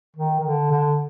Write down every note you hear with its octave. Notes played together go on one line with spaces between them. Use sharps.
D#3
D#3
D3
D3